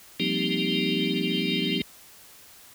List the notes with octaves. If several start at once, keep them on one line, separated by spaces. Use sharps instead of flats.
F3 G3 A#3 C4 D#4 G4